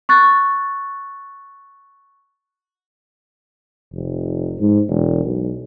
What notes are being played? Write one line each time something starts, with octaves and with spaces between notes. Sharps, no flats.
C#6 F#6 A6
F1
G#2
E1
B1